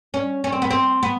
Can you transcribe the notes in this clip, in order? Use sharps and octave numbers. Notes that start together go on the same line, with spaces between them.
C#4
C#4
C4
B3
C4
B3